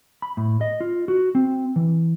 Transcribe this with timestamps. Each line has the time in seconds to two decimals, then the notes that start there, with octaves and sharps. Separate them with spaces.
0.22 B5
0.37 A2
0.61 D#5
0.81 F4
1.08 F#4
1.35 C4
1.76 E3